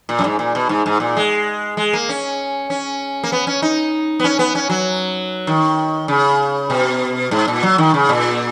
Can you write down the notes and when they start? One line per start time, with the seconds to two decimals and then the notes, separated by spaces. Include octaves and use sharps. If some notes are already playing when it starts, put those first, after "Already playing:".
0.09 A#2
0.19 F#2
0.24 G#2
0.39 A#2
0.55 B2
0.69 G#2
0.86 G#2
1.00 A#2
1.17 G#3
1.77 G#3
1.93 A#3
2.09 C#4
2.70 C#4
3.24 A#3
3.32 B3
3.47 C#4
3.62 D#4
4.20 B3
4.24 C#4
4.39 B3
4.55 C#4
4.70 F#3
5.47 D#3
6.08 C#3
6.70 B2
7.31 G#2
7.48 A#2
7.63 F#3
7.78 D#3
7.94 C#3
8.09 A#2